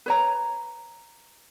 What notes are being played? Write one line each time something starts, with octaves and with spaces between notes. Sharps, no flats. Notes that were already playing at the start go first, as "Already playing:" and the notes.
B4 C#5 A#5